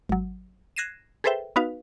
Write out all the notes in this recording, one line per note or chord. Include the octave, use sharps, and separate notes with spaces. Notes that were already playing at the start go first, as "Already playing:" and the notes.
G#1 F#3
F#6 G#6 A#6 C7 D#7 E7
G#4 A4 B4 C5 E5 G5
B3 D#4 F#4 B4 F5